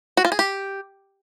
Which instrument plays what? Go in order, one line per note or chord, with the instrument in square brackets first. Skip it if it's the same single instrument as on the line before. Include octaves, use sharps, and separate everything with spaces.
[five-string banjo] F#4
F4
G#4
G4